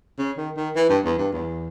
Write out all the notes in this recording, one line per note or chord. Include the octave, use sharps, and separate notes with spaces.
C#3
D#3
D#3
E3
G2
E2
G2
E2